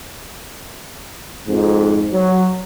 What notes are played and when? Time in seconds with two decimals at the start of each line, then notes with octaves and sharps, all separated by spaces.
1.47 F2 G#2
2.13 F#3